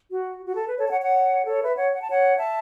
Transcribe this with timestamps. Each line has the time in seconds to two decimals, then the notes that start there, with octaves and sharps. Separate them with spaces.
0.10 F#4
0.45 F#4
0.55 A4
0.67 B4
0.79 A4 C#5
0.86 A5
0.90 C#5 F#5
1.01 C#5 F#5
1.46 A4 C#5
1.62 B4 E5
1.77 C#5 F#5
1.92 F#5
2.01 A5
2.10 C#5 F#5
2.38 E5 A5